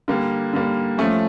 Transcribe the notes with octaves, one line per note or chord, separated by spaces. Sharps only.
D3 G3 A#3
D3 G3 A#3
F3 A3 C#4